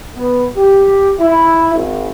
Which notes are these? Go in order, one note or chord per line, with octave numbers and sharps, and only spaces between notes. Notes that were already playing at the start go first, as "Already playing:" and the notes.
B3
G4
E4
G#1